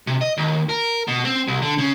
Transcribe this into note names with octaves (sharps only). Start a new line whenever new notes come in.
C3
D#5
D#2
A#4
B2
C4
C2
D3
C#3